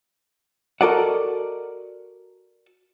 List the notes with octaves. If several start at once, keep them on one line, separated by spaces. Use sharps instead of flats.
F#4 A4 A#4 D5 D#5 F#5